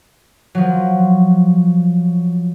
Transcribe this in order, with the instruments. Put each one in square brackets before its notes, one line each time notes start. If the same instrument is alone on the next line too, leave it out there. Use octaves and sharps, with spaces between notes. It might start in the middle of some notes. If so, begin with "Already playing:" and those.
[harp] F3 F#3